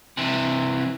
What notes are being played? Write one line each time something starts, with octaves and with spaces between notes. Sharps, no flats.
C3 E3